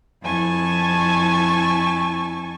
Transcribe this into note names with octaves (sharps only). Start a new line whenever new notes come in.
F2 E4 G#5 A5 C#6